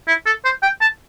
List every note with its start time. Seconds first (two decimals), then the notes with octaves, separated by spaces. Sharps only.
0.08 E4
0.26 A4
0.45 C5
0.62 G5
0.81 A5